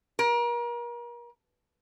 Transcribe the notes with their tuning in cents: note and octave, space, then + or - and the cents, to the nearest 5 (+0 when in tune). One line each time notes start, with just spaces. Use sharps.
A#4 +35